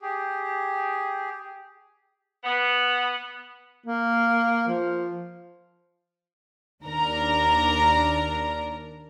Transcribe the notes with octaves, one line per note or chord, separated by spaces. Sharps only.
G4 G#4
B3
A#3
F3
D#2 D4 A#4 A#5